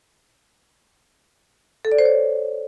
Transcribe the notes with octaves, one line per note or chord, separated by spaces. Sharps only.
A4
D5
C5
C#5